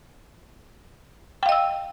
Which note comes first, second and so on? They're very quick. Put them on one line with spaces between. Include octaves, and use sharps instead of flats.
G5 F5 D#5 E6